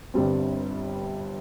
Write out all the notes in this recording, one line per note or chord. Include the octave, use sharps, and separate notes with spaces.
G1 G2 G3 C4